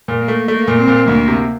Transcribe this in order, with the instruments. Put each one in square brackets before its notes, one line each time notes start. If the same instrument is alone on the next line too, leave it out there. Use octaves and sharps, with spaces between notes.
[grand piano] A#2
[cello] A#3
[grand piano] A3
[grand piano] A3 [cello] A#3
[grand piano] A#2
[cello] C4
[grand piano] A#2
[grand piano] D2 [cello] A#3
[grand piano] C3